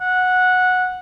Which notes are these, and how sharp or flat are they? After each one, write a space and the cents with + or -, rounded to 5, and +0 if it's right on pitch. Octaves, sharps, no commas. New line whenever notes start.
F#5 -10